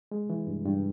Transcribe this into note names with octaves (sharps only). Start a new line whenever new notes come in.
G#3
E3
G2
G2